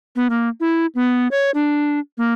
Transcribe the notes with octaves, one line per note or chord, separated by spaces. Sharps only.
B3
A#3
E4
B3
C#5
D4
A#3